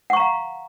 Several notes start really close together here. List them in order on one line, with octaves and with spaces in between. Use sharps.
F#5 C#6 A#5 F5